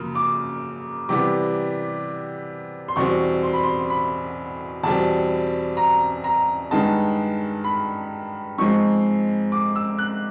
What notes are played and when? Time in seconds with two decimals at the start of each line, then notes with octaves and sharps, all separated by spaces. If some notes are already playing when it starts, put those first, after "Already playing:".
Already playing: F#2 C#3 F3 A#3
0.15 D6
1.09 C3 E3 G3 B3 D6
2.88 C6
2.96 E2 B2 G3 C4 C#6
3.43 C6
3.53 B5
3.63 C6
3.90 B5
4.83 E2 B2 G3 C4 A5
5.77 A#5
6.24 A#5
6.71 G2 D#3 G#3 B3 D#4 A5
7.64 B5
8.58 G#2 F3 G#3 C4 C#6
9.52 D6
9.75 E6
9.99 F#6